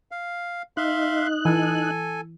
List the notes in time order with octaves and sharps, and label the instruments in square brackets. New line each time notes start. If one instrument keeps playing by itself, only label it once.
[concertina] F5
[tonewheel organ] D#4 F#6 [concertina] E5 F5 C6
[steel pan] E3 [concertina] A4 G#5